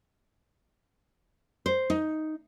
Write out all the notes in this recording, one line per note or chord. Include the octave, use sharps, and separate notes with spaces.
C5
D#4